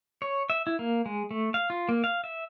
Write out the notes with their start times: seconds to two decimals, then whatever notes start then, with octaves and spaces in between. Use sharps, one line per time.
0.22 C#5
0.50 E5
0.67 E4
0.79 A#3
1.06 G#3
1.31 A3
1.54 F5
1.70 F4
1.89 A#3
2.04 F5
2.24 E5